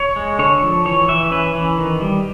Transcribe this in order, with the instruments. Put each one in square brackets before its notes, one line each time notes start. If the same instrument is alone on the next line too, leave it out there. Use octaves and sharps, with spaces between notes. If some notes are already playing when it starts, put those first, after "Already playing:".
Already playing: [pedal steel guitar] C#5
G#3
D3 C#5
F3
E3 C#5
E3 E5
C#4 B4
E3
D#3
G3